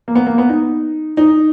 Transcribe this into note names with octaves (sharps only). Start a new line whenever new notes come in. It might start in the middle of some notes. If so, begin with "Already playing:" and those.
A#3
B3
A#3
B3
D#4
D#4